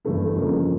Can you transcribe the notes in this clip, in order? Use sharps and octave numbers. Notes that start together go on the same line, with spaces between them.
G1 G2 E3 A3 E4
G1 F2 C#3 F3 A#3